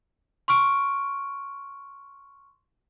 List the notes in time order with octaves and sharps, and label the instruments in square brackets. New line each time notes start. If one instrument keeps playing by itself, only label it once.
[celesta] C6 C#6 F6 D7